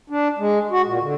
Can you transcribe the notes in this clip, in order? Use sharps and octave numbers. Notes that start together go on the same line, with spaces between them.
D4
G#3
F#4
A#2
D3